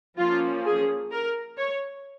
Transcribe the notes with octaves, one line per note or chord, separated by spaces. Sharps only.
F3 A#3 C#4 F4
G#4
A#4
C#5